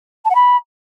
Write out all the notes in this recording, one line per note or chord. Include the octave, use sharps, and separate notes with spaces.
A5
F#5
B5